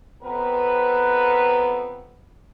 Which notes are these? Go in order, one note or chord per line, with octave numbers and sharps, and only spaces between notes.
F2 B3 C4 A#4 B4